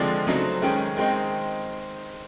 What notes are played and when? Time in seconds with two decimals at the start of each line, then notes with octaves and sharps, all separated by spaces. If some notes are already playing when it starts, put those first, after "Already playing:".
Already playing: D3 F3 G#3 C4 D5
0.27 C#3 F#3 A3 C4 D#4
0.62 D#3 G#3 C#4 G5
0.97 D#3 G#3 C4 D#4 G5